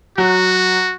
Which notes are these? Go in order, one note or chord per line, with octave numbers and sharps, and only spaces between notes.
F#3 F#4